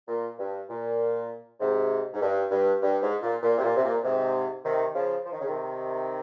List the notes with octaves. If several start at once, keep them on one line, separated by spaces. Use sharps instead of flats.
A#2
G2
A#2
G#2 C3
G#2
G2
G2
G2
G#2
A#2
A#2
C3
A#2
C3
A#2
G#2 C3
C3 D#3
C#3 F3
F3
D#3
C#3
C3 D#3